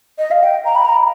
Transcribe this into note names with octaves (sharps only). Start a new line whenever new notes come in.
D#5
F5
G5
A#5
B5
A#5